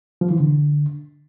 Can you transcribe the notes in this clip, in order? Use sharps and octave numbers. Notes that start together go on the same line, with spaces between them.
F3
E3
D3